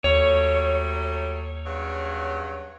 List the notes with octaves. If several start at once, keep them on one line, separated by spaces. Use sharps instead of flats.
D#2 F#3 G3 A3 C#5
G2 C#3 F#3